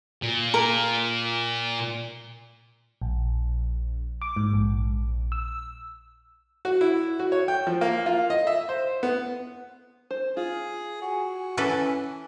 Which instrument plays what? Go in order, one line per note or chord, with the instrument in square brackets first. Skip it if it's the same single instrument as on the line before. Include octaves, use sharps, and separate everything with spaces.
[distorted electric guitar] A#2
[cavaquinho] A#4
[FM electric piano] A#1
D6
G#2
A#1
E6
[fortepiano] F#4
E4
F#4
C#5
G5
F3
A#3
F4
D#5
E5
C5
B3
[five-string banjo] C5
[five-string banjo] F4 [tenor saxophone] G#4
[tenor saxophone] F#4 [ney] G#5
[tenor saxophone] E3 [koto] C#4 A4 B4